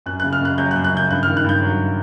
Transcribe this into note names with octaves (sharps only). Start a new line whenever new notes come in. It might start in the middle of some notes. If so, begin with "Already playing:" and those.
F#2 F#6
C#3 F#6
F6
F#2 F#6
F#3 G6
F#6
F#2
F#6
C#3 G6
G2 F#6
D#3 F6
F#6
G2 G6
F#3